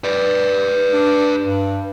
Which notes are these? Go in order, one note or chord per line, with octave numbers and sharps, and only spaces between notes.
B4 D5
D4
G2